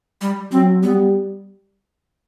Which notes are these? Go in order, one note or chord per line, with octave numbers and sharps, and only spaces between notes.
G3
F#3 C4
G3 B3